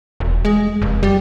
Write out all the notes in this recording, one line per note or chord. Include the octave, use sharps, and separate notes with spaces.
E1
G#3
F1
G3